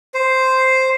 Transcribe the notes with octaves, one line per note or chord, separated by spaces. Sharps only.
C5